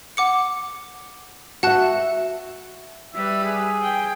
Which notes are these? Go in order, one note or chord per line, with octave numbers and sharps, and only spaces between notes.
F#5 D6 C#7
F#4 E5 F#5 A5 F#6
G3 B4 E5
G#4
G5